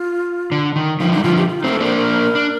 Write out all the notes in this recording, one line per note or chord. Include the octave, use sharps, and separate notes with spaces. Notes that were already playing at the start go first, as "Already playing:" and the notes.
Already playing: F4
D3
D#3
D3 F3 D#4
D#4
G3
D3 F3 F4
G4
F4
D#4
A3 C4 A#4
A4
A#3 D4 C5
A#4
D4